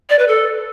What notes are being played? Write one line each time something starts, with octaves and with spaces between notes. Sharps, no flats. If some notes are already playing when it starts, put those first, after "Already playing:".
D5
B4
A4